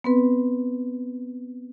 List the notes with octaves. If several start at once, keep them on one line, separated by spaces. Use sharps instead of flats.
B3 C4 B4